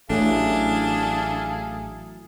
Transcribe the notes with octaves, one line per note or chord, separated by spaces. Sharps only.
A1 E3 F#3 A3 D4 G#4 A4 F5